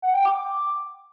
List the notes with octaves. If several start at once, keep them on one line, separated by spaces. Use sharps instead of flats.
F#5
G5
D6